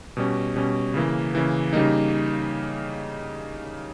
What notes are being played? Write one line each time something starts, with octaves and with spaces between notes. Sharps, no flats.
B2 G3 C#4
B2 G3 C#4
C#3 E3 A#3
C#3 E3 A#3
C#3 G3 A#3 D#4